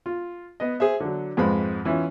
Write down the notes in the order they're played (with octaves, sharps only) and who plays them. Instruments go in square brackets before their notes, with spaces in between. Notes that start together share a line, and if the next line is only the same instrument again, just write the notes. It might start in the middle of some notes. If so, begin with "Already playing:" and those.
[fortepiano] F4
B3 D#5
G#4 C5 E5
D3 F#3
F2 G#2 G#3 B4 C5 B5
E3 C#4 E4 F4